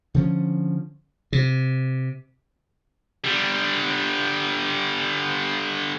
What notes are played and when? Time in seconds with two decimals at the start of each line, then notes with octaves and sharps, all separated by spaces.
0.14 D3 F3 C#4
1.33 C3
3.24 D3 G3